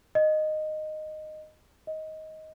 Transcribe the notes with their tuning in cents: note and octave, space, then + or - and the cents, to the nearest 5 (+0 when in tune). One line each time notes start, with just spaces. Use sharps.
D#5 -10
D#5 +15